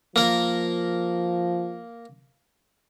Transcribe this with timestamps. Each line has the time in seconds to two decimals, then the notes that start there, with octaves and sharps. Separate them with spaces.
0.16 F3 A#3 A#4